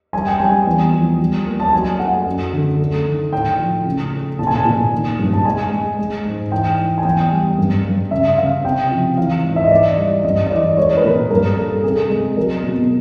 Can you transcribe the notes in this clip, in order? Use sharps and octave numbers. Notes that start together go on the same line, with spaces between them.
G3 G#5
G5
G3 G#5
E2
F3
G3
A#3
A5
F#3 G#5
A3 F#5
F#2
D3
A3
D#3
A2 G5
F3
C#3
A3
A#2 A5
G#5
A5
A#2
D#3
G2
A5
G#3 G#5
G#3
G#3
G#2
E3 G5
E3
G#5
E2 G5
G3
G2
G2
C#3 E5
C#3 F5
C3 G5
F3
E3 F5
G#2
E5
D#5
E3 D5
G3
G2 D#5
D#5
E3 D5
G#3 C#5
B4
A#2 A#4
G2 A#4
G3 A4
C3 G#4
G#3
F#3 A#4
B2